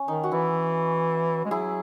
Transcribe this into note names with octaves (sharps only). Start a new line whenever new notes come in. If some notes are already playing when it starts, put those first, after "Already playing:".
Already playing: C#4
D#3 D#4
F#4
E3 E4
G#3
F#3 E4 G#4